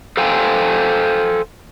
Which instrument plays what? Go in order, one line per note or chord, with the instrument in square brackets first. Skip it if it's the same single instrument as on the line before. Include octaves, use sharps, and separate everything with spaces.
[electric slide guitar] A4 C5 F5 G5 G#5